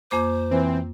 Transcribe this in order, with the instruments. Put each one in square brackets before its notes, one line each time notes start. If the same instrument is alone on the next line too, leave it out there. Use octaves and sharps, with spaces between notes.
[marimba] F2 A#3 D6 [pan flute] C5
[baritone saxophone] E3 [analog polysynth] C4